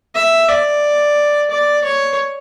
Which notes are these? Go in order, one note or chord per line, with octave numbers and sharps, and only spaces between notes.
E5
D5
D5
C#5